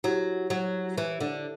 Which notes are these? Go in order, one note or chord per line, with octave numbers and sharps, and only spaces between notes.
F#3 E4 G4 C#5
F#3
E3
D3